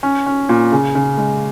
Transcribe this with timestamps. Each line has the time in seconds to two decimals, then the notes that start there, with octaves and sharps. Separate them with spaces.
0.03 C#4
0.26 C#4
0.49 A#2
0.72 C#3
0.95 C#3
1.17 G#3